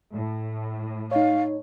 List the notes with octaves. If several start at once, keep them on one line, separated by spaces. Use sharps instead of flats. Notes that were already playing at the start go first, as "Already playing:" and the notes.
A2
D#4 C#5 F5